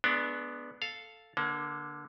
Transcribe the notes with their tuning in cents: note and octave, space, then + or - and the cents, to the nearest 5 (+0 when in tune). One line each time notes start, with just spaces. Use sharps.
G#3 +35 B3 -5 D4 +0
A4 +0 F5 +0
D3 +0 A#3 +30